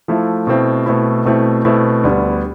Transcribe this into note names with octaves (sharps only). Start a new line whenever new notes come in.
F3 A3 E4 A4
B2 A3 C4 E4
B2 A3 C4 E4
B2 A3 C4 E4
B2 A3 C4 E4
D2 D3 G3 B3